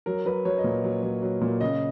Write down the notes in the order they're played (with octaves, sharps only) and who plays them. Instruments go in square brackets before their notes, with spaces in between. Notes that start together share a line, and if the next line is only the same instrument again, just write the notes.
[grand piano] F#3 A#4
F#3 B4
F#3 C#5
D#5
A#2
F#3
F#3
F#3
A#2
C#3 D#5